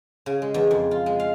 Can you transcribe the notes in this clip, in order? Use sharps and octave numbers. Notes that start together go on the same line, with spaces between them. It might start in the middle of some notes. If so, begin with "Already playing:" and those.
C#3
G#3
E2
F2
F4
G#3
F5